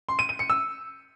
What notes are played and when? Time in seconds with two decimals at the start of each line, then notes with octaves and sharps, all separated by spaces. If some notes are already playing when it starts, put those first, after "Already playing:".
0.09 C6
0.19 D#7
0.29 D#7
0.39 C#7
0.50 E6